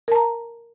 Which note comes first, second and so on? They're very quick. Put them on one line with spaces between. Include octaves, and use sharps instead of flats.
A#4 A5 A#5